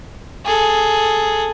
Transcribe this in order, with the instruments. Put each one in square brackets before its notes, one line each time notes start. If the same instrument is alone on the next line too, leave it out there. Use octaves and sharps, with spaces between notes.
[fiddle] G#4 A4